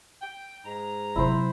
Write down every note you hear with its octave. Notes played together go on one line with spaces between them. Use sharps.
G5
G#2 A#5
C3 F#3 E4 C5